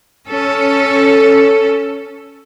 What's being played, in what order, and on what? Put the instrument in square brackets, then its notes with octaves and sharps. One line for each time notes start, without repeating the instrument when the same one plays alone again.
[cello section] C#4 A4